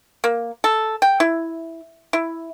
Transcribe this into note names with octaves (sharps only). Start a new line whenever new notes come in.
A#3
A4
G5
E4
E4